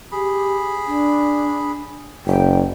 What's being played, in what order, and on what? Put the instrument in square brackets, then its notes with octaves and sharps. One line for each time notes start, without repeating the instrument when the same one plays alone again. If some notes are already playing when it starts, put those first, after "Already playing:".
[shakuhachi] G4 [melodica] G#4 B5
[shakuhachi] D4
[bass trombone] F#1 [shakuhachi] G5